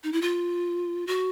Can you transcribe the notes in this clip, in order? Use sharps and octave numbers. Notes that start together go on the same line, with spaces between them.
D#4
E4
F4
F#4